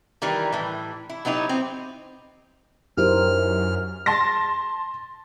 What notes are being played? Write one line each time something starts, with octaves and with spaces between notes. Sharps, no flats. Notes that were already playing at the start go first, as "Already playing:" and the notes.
D#3 E3 G3 A#4
A2 E3
E4
F#3 B3 D#4 E4 G4
C4
F#2 F#3 D#4 E4 G4 A#4 C5 F6
A5 C6 A6 A#6